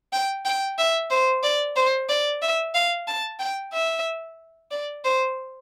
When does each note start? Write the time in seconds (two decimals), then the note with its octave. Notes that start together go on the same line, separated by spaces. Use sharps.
0.13 G5
0.45 G5
0.78 E5
1.10 C5
1.43 D5
1.76 C5
2.09 D5
2.42 E5
2.74 F5
3.08 A5
3.39 G5
3.73 E5
4.71 D5
5.05 C5